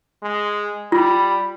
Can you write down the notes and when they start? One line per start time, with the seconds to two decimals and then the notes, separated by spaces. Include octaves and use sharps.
0.23 G#3
0.92 G3 F4 B5